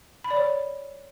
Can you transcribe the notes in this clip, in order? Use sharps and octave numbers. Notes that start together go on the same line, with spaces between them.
B5
D5
C#5